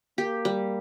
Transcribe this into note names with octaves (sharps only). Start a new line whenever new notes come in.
A#3 G4
G3